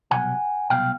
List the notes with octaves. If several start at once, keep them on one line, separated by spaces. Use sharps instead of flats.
C2 B2 F#3 F#5 G#5
C2 B2 F#3 F5 G5